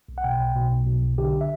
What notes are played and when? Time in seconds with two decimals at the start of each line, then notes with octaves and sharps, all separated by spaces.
0.09 B1
0.18 F#5
0.24 B2 G5
0.40 B1
0.56 B2
0.72 B1
0.87 B2
1.03 B1
1.18 D3 G4
1.41 E5